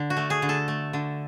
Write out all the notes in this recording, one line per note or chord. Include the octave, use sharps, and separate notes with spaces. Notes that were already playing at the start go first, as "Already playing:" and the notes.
Already playing: D3
F#4
A3
G#4
D3
A4
A3
D3